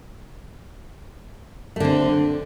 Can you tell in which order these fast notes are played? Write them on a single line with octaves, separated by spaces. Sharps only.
A3 D3 C4